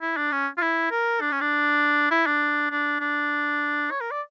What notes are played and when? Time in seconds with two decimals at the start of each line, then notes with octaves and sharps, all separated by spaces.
0.01 E4
0.17 D4
0.32 C#4
0.58 F4
0.62 E4
0.91 A#4
1.21 D4
1.32 C#4
1.41 D4
2.11 E4
2.26 D4
2.71 D4
3.00 D4
3.91 C#5
4.01 A#4
4.11 D5